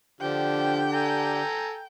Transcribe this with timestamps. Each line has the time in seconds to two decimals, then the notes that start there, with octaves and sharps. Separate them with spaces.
0.21 D3 F3 D4 G4 G5
0.92 A4 G#5 A#5